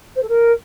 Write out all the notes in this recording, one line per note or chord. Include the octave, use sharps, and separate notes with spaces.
C5
A4
A#4